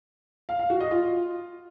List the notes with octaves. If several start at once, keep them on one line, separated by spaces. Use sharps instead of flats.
F5
F5
F#4
D#5
F4